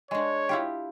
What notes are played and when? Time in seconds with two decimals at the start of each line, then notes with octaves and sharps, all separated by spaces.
0.11 G#3 D4 C#5
0.49 E4 F4 G4